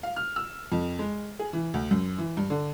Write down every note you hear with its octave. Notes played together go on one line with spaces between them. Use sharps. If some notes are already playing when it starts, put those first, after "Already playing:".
F5
F6
E6
F2
G#3
G#4
E3
D2
F#2
E3
G2
D3